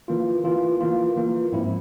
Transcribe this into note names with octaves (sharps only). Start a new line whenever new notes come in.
E3 A#3 F4
E3 A#3 F4
E3 A#3 F4
E3 A#3 F4
G#2 F3 C4 E4